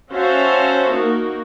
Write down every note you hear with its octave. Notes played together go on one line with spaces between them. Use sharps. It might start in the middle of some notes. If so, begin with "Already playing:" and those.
C#4 F#4 C5 E5 F5 A5
A#3 D#4 F#4